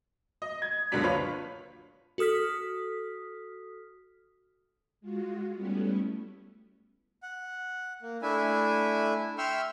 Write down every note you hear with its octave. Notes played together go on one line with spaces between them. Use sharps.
D#5
G#6
F#1 C#2 D3 F#3 D4 B6
F4 B4 C#5
F#4 A4 D#6 F6 B6
G#3 F4 F#4
G3 A3 B3 C#4 E4
F#5
A#3
A3 D4 E4 E5 G#5
E5 G5 C6 C#6 E6 F6